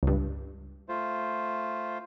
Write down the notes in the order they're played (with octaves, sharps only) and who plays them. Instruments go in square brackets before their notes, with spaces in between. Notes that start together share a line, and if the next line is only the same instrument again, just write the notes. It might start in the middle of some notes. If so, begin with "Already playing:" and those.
[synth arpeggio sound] C#2 G2
[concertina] A3 F4 C5